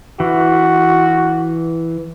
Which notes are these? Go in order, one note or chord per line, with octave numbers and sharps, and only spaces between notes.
E3 F#4